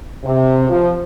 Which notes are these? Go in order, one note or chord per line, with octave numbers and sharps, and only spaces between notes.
C3
F3